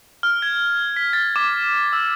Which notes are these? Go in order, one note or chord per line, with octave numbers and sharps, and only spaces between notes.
F6
G#6
B6
A6
D6
E6